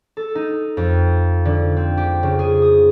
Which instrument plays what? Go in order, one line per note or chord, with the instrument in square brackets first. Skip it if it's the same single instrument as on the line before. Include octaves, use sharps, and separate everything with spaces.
[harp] A4
D#4
F2
D3
C4
G4
C#3
G#4
D#6